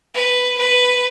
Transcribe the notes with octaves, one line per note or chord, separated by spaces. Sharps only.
B4
B4